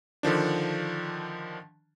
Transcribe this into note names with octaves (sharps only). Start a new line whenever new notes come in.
D3 D#3 F3 D4